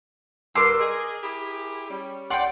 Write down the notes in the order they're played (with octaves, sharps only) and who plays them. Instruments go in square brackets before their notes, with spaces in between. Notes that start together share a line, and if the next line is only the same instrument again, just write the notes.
[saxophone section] G2 G3 [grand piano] A#4 D6 E6 [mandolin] C6
[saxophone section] G#4 D#5
E4 G4 G#4
G3 C#4
[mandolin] D5 G5 [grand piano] F#5 C6